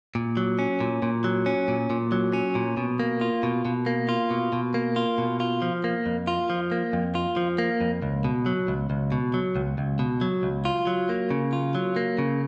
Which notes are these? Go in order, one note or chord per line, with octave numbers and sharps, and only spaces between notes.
A#2
F#3
C#4
A#2
A#2
F#3
C#4
A#2
A#2
F#3
C#4
A#2
B2
A#3
F4
B2
B2
A#3
F4
B2
B2
A#3
F4
B2
F4
F3
A#3
F2
F4
F3
A#3
F2
F4
F3
A#3
F2
C#2
B2
F#3
C#2
C#2
B2
F#3
C#2
C#2
B2
F#3
C#2
F4
F#3
A#3
C#3
F4
F#3
A#3
C#3